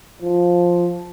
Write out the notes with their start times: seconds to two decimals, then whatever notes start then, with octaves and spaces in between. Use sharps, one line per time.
0.22 F3